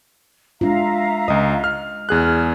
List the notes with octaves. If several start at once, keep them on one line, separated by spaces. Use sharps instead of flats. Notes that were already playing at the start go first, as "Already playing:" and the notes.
G#3 D4 F4 E5 F5 A#5
C#2 D#5 D#6
F6
E2 G#4 F6 F#6